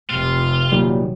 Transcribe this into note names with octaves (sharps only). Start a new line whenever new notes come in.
F1 C3 F4
A#2 D#3 F#3 G3